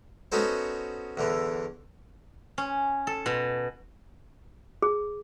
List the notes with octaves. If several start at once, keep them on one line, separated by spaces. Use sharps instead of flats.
B3 C#4 D#4 F#4 A4 C5
E2 D3 E3
C#4
A4
B2
G#4